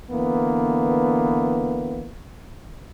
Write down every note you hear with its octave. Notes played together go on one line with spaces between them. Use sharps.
D3 E3 A#3 B3